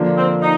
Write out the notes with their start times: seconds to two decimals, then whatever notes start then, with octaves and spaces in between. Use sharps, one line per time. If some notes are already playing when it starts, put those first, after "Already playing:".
Already playing: D3 F3 A#3 D4
0.17 C4
0.42 D#4